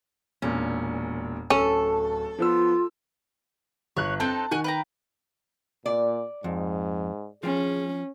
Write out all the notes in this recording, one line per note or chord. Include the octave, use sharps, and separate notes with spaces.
E1 A#2 C#4 D4
D1 C#4 A4
F3 B3 F4 E6
G1 C#5 F#6
C4 D#4 A4 A5
D#3 F#4 G#5 F#6
B4 G5 A#5
A#2 D5
F2 G#2
F3 C#4 G#4